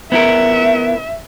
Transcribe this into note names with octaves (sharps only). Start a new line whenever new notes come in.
B3 E4 A#4 E5